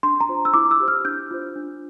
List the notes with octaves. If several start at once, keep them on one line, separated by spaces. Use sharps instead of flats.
D4 C6
A#5
F4 C5
E6
E4 D6
E6
G4 C5
F6
D4 G6
F4 C5
D4